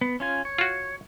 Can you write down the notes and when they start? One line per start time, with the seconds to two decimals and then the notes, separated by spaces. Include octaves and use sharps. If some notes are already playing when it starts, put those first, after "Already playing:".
0.01 B3
0.20 C#4 F4 G#5
0.45 C#5
0.58 F4 F#4